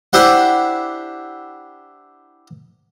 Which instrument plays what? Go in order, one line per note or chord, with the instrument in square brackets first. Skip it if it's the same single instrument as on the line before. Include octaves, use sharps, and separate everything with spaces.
[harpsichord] D4 E4 G4 C5 F#5